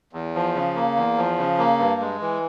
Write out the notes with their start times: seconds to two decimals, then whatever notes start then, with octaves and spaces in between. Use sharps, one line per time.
0.13 E2
0.35 F3
0.54 C#3
0.75 A#3
0.96 E2
1.18 F3
1.38 C#3
1.58 A#3
1.79 G2
2.01 G#3
2.21 E3